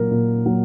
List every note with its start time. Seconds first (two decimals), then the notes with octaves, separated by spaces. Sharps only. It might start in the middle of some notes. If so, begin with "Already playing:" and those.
Already playing: A#2 F#3 A#3 A#4
0.11 A#2
0.46 F#3 A#3